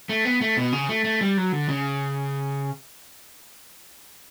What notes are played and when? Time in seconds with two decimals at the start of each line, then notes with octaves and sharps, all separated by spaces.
0.09 A3
0.25 B3
0.41 A3
0.57 B2
0.73 C#3
0.89 A3
1.04 A3
1.21 G3
1.37 F#3
1.52 D3
1.69 C#3